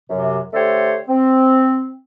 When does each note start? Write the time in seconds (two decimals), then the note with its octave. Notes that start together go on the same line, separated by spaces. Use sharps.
0.10 F#2 C3
0.53 D3 A3 G4 A4 C5 C#5
1.09 C4